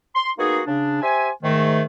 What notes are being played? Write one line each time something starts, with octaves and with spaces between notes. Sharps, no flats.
C6
A#3 B3 D#4 F#4 G#4
C#3 D4
G4 C5 E5 G#5
G#2 D#3 A3